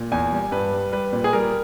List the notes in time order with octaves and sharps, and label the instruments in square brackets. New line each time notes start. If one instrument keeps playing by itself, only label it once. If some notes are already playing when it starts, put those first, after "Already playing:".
Already playing: [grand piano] A#2
E2 G#5
G3
G2 B4
G3
G3 B4
A#2
G#4
G3 A#4